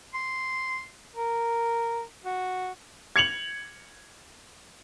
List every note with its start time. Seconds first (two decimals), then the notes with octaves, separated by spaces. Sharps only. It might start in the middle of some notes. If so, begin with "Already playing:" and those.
0.14 C6
1.15 A#4
2.25 F#4
3.16 G#6 C#7 F7 F#7